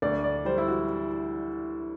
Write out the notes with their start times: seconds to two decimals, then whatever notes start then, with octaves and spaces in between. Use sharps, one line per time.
0.02 D2 D5
0.24 D5
0.45 G3 C5
0.58 E4
0.68 F#4